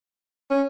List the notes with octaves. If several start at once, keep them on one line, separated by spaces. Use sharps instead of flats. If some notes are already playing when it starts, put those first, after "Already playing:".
C#4